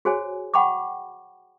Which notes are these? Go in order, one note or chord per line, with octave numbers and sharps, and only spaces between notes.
F#4 G#4 C5 C#5 G#5
F#5 G5 B5 C#6 D6